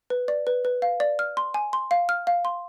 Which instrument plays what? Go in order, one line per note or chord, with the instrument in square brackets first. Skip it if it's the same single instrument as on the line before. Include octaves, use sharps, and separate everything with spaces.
[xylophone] B4
D5
B4
B4
F5
D5
F6
C6
G#5
C6
F5
F6
F5
C6